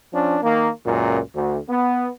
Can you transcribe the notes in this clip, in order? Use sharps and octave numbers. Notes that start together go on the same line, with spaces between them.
F3 C#4 D4
D#3 A#3
C#2 F#2 A#2
D2
B3